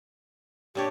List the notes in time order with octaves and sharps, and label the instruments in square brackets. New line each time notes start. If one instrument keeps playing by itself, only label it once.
[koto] A#2 D4 C#5 [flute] G4